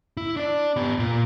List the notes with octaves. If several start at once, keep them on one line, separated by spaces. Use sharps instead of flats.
E4
D4 D5
B3 G4
A#2 F4